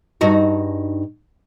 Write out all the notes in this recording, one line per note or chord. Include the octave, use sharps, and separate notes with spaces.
G2 D#4 F#4